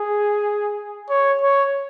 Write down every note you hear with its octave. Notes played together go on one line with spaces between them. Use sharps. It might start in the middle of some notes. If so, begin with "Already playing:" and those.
Already playing: G#4
C#5
C#5